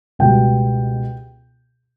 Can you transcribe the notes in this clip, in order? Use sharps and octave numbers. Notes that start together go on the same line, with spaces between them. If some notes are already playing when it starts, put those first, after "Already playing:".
C#2 B2 G3 B3 G5